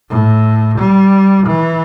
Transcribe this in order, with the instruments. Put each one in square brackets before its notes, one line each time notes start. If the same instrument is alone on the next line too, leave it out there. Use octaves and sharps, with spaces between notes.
[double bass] A2
G3
E3